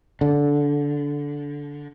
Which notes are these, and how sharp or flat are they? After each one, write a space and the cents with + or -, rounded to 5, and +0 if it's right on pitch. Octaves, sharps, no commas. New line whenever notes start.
D3 -15